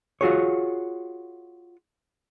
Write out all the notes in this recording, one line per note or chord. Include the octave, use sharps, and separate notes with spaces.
F4 F#4 G#4 C#5